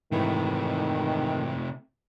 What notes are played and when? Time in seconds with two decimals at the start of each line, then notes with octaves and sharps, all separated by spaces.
0.12 G#2 C3 D#3 E3 A3 E4